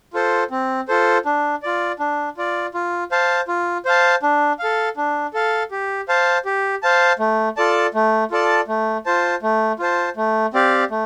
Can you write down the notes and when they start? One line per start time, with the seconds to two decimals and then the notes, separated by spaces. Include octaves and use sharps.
0.14 F4 A4 C5
0.51 C4
0.88 F4 A4 C5
1.25 D4
1.63 F4 D5
1.99 D4
2.37 F4 D5
2.74 F4
3.12 C5 F5 A5
3.48 F4
3.86 C5 F5 A5
4.23 D4
4.59 A4 F5
4.97 D4
5.34 A4 F5
5.71 G4
6.08 C5 F5 A5
6.45 G4
6.83 C5 F5 A5
7.19 A3
7.57 F4 A4 D5 A5
7.94 A3
8.31 F4 A4 D5 A5
8.68 A3
9.06 F4 C5 A5
9.43 A3
9.79 F4 C5 A5
10.17 A3
10.54 C4 G4 D5 F5
10.91 A3